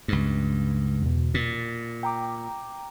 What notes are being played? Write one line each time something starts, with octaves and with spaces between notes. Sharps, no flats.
C#2 G2
E2 B2
A#2 A6
G5 A#5 D6